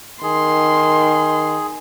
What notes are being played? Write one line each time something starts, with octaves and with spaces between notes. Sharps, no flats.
D#3 G#4 C6